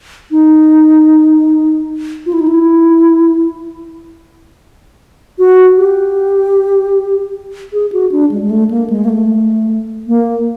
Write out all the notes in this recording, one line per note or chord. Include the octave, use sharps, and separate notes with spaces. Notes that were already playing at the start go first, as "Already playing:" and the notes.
D#4
F4
E4
D#4
E4
F#4
G4
G#4
F#4
D4
G#3
G#3
A3
A#3
G#3
A#3
A3
A#3